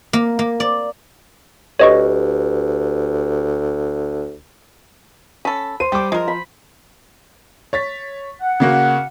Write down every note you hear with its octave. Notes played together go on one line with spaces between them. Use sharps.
A#3
A#3
D5
D2 G4 B4 C#5 D#5 C#6
C#4 A4 B5
C5 D#7
G3 G4 D6
F3 G#3 A#4
B5
C#5 A6 B6
F#5
C#3 A#3 F#4